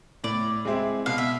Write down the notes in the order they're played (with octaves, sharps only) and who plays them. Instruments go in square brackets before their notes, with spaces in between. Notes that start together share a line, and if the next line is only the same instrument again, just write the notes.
[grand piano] A2 [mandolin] D5
[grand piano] G#3 C4 E4
[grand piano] B2 [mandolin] F5
[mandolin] E5